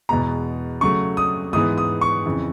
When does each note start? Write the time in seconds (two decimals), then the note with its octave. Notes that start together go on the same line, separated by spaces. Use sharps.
0.09 E2 B2 G#3 B3 A#5
0.81 C#3 F#3 A3 C#6
1.17 D#6
1.53 G#2 E3 G#3 B3 D#6
1.78 D#6
2.01 C#6
2.26 F2 C#3 E3